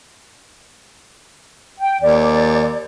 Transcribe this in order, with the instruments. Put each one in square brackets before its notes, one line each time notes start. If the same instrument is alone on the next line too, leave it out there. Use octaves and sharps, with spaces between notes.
[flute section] G5
[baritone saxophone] D#2 [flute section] D5